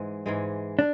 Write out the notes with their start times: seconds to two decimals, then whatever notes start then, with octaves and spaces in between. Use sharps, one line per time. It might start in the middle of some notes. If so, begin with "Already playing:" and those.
Already playing: G#2 E3 G#3
0.26 G#2 E3 G#3
0.79 D4